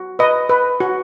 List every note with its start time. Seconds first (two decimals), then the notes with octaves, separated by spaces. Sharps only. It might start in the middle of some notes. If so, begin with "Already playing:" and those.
Already playing: F#4
0.19 B4 D#5
0.49 B4
0.80 F#4